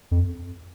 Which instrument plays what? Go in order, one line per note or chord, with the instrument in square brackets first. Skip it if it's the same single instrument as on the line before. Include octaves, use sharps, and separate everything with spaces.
[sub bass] F2